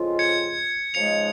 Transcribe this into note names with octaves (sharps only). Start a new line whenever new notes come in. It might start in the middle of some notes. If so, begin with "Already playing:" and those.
Already playing: F2 C#3 G#3 F4
G#6 C#7
C#3 F3 G#3 D#4 C#7 F7